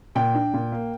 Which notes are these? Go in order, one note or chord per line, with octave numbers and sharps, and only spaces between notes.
A#2 G5
D4
A#2
A#3